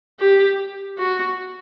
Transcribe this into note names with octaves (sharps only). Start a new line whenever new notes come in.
G4
F#4